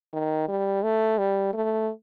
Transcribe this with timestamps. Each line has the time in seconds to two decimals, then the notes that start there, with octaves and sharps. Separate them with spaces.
0.13 D#3
0.48 G3
0.83 A3
1.18 G3
1.54 A3